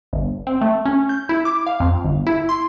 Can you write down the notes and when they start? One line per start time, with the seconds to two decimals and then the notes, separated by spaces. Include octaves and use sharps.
0.13 G1
0.47 C4
0.61 A3
0.86 C#4
1.09 G6
1.29 E4
1.45 D6
1.67 F5
1.80 F2
2.05 G1
2.27 E4
2.49 C6